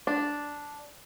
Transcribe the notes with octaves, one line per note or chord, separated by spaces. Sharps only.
D4